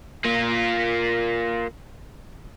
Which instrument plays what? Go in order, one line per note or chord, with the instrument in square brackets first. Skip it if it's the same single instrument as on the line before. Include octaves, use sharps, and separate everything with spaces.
[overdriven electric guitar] A#3 F4